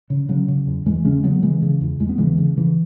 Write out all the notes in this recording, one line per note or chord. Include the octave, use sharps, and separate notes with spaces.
C#3
C#3 F#3
C#3
E2
E2 E3 G#3
C#3 G#3 C#4
C#3 F#3 B3
C#3 E3 G#3
C#3
E2
E2 G#3
B3
C#3 E3 G#3
C#3
C#3 E3